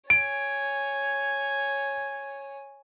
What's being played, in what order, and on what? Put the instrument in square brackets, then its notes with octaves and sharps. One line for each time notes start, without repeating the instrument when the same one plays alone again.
[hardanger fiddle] C#5 G#5 [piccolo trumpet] G#6 [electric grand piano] D7